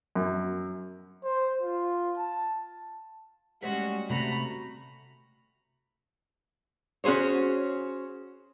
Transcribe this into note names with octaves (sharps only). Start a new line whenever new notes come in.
F#2
C5
F4
A5
G3 G#3 C#4 F#4 C#5 E5
C3 A3 F#4 A#5 B5
C#4 F#4 G#4 C5 C#5